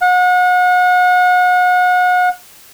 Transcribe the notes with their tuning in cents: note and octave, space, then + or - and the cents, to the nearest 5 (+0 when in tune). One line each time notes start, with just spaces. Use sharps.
F#5 -35